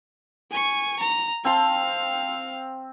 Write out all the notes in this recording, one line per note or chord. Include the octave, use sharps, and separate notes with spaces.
G#5 C#6
A#5
C4 F5 A5 C6